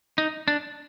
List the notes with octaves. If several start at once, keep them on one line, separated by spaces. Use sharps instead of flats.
D#4
D4